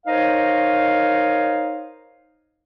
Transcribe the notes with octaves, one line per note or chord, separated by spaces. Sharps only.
D#4 A#4 C5 C#5 D#5 F5